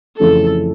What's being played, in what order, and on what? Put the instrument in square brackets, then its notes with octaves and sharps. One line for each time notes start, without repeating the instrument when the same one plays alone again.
[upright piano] F2 C#3 E3 A3 C#4 [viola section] A4